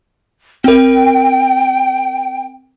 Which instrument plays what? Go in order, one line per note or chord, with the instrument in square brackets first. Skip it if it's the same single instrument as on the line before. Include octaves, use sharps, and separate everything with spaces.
[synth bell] C4 A#4 [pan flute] G5